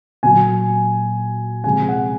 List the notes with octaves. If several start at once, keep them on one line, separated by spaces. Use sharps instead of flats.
A#2 F#3 G#5
C3 F3 G#3 G#5
F#5